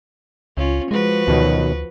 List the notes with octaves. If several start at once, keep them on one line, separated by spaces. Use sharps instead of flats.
C#2 C#4 F4
F3 G#3 F#4 B4
D2 B2 D#3 F#3